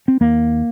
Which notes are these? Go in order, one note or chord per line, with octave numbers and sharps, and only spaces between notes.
C4
D#2 A#3